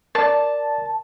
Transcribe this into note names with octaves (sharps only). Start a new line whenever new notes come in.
A#4 D5 A5